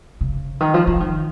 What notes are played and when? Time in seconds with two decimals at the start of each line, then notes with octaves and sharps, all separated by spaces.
0.21 C#3
0.60 D#3
0.74 F3
0.87 F3
1.00 D#3